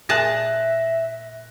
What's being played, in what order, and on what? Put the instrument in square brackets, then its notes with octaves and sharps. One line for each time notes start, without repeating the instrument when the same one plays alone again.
[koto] A#2 G#4 A5 [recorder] E5 [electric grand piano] F#6 A#6